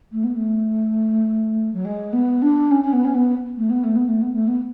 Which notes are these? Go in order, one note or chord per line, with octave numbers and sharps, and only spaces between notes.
A3
B3
A3
F#3
G#3
B3
D4
C#4
C#4
B3
C#4
B3
A3
B3
A3
B3
A3
B3
A3
B3